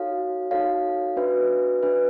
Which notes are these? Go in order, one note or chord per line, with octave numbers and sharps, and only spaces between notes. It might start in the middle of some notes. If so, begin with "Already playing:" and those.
Already playing: D#4 F#4 A4 C#5 F5
D#4 F#4 A4 C#5 F5
D4 F#4 B4 E5
D4 F#4 B4 E5